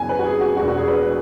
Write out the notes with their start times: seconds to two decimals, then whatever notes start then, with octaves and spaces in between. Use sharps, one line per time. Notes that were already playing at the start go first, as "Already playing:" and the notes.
Already playing: F#2 C#3 E3 B3 G#5
0.09 B4
0.19 F#4
0.25 G#4
0.41 F#4
0.57 E1 E2 B2 F#4
0.68 F#4
0.77 G#4
0.88 B4